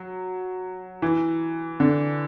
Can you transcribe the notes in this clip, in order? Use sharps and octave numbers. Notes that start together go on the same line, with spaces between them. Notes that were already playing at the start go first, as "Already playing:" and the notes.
Already playing: F#3
E3
D3